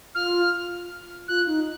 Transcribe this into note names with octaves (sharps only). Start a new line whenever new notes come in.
F4 F6
F4 F#6
D#4